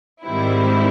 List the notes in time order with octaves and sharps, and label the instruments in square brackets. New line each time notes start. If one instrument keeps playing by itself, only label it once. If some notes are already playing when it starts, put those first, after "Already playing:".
[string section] G#2 D#3 G3 C4 E4